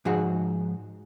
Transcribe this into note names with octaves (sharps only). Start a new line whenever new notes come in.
G#2 F3 D#4 F#4 G#4 F#5